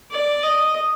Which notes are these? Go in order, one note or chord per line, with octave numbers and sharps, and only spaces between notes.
D5
D#5